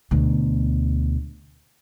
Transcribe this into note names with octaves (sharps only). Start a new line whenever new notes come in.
D2 B2